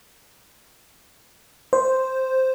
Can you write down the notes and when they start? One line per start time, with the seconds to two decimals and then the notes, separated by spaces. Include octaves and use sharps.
1.73 C5